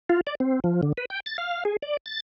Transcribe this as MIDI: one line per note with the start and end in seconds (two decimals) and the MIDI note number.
0.09 0.21 65
0.27 0.35 74
0.40 0.60 60
0.64 0.81 53
0.83 0.93 50
0.97 1.05 71
1.10 1.20 79
1.26 1.37 93
1.38 1.64 77
1.65 1.77 68
1.82 1.97 74
2.06 2.20 93